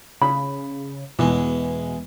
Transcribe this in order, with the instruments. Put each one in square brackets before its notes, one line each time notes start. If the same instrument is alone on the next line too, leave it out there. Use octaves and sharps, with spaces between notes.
[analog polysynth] C#3 [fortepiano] B5
[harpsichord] E2 G#3 [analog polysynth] B2 [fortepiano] E3